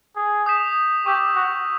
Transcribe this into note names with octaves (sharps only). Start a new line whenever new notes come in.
G#4
D#6 G6 B6 E7
G4 C#6 E6 G6
F#4